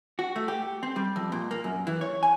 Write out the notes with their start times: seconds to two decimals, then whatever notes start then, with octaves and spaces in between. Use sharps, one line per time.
0.19 F#4
0.36 A3
0.48 G4
0.83 C4
0.96 G3
1.16 F2
1.32 A#2
1.51 A#3
1.64 F#2
1.87 E3
2.01 C#5
2.23 G#5